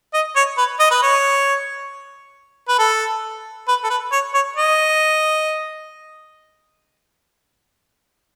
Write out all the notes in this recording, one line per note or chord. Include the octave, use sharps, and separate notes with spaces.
D#5
C#5
B4
D#5
B4
C#5
B4
A4
B4
A4
B4
C#5
C#5
D#5